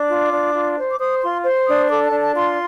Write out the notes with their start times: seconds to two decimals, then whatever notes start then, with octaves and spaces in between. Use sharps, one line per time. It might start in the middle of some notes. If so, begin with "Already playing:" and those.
Already playing: D4 D6
0.09 F4
0.32 D4
0.55 F4
0.77 C5
0.91 D6
0.99 C5 D#6
1.22 F4 C6
1.45 C5 C6
1.67 D4 D#6
1.90 A4 D6
2.05 A5
2.12 D4
2.20 A5
2.34 F4 C6